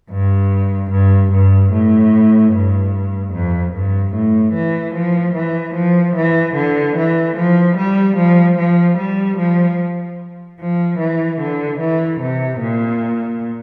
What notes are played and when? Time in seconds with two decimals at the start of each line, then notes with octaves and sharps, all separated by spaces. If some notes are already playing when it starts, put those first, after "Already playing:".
0.11 G2
0.91 G2
1.32 G2
1.73 A2
2.53 G2
3.34 F2
3.74 G2
4.14 A2
4.54 E3
4.95 F3
5.35 E3
5.75 F3
6.16 E3
6.56 D3
6.97 E3
7.37 F3
7.77 G3
8.17 F3
8.58 F3
8.98 G3
9.38 F3
10.60 F3
10.99 E3
11.41 D3
11.80 E3
12.21 C3
12.60 A#2